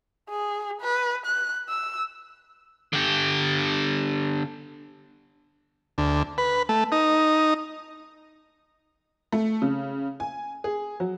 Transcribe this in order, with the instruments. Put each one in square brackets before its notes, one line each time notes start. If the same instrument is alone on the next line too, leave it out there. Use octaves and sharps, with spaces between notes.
[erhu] G#4
B4
F#6
E6
[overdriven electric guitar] D3 G4
[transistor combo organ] D2
B4
A3
D#4
[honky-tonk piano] A3
C#3
G#5
G#4
F#3